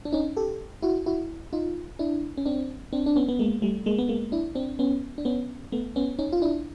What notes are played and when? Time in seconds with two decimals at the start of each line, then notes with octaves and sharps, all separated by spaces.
0.05 D4
0.13 C#4 D#4
0.37 G4 A4
0.82 E4 F#4
1.06 E4 F#4
1.53 D#4 F4
1.99 D4 E4
2.37 C#4
2.46 C4 D4
2.93 C4 D4
3.06 D4
3.16 B3 C#4
3.29 B3
3.39 G#3 A#3
3.62 G3 A3
3.86 G#3 A#3
3.98 B3
4.09 G#3 A#3
4.32 D4 E4
4.55 C4 D4
4.79 B3 C#4
5.18 D4
5.25 B3 C#4
5.72 A3 B3
5.96 B3 C#4
6.19 C#4 D#4
6.32 F4
6.42 D4 E4